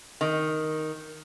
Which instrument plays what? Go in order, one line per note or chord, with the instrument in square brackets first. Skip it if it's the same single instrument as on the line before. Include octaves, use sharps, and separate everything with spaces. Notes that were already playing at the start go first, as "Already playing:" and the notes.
[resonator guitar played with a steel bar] D#3